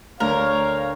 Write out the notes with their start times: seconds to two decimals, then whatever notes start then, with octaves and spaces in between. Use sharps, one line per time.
0.20 D2 A#4 C#5 F5